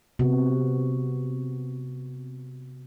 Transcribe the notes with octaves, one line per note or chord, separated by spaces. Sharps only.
C3 B3 F#4